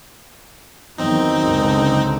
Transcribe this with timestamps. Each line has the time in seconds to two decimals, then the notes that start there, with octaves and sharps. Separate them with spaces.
0.98 E2 D#3 F#3 C4 D#4
1.43 F#1 C#2 D3